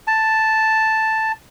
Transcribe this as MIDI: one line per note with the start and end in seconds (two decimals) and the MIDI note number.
0.07 1.32 81